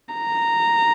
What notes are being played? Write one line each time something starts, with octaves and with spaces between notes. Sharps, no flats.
A#5